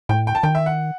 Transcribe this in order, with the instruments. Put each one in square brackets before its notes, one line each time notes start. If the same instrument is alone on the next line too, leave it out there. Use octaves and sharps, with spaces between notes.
[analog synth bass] A2 [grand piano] G5
[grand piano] G5
A5
[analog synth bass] D#3 [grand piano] G5
[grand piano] E5
F#5